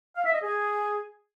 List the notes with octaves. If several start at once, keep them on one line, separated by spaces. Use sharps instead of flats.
F5
E5
D#5
G#4